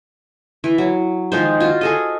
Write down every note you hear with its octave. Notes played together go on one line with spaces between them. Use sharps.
E3
F#3
D#3 F3 G#3 C5
F4 F#4
G#4 A4 D#5